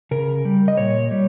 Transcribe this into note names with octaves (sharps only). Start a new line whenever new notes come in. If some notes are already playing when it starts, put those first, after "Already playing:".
C#3 A#4
G3
D#5
A#2 C#5
G3